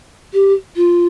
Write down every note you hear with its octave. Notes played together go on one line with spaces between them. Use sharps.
G4
F4